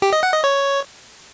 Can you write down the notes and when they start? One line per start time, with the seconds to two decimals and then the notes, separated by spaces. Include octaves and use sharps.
0.02 G4
0.13 D#5
0.23 F#5
0.33 D#5
0.44 C#5